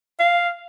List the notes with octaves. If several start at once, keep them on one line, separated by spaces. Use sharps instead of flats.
F5